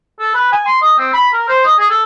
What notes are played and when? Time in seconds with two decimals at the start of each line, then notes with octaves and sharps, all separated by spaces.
0.19 A4
0.35 B4
0.52 G#5
0.66 C6
0.82 D#5
0.99 C4
1.14 B5
1.33 A#4
1.49 C5
1.65 D#5
1.79 G#4
1.90 A4